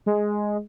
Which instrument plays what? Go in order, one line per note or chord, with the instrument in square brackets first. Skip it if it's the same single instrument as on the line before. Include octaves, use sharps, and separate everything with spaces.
[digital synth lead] G#3